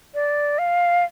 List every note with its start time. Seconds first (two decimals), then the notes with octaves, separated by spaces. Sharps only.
0.14 D5
0.58 F5